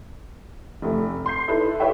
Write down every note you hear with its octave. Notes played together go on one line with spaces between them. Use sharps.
F1 A3
C6 G6 C7
D#4 E4 A4 B4
G4 A4 B4 C#5 E5 G5